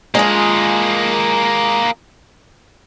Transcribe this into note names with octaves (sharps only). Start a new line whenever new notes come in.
G#3 A#3 F4 G#4